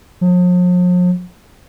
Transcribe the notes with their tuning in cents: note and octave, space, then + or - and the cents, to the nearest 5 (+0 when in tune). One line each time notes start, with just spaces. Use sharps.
F3 +45